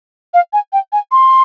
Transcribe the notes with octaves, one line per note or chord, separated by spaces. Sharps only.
F5
G#5
G5
G#5
C6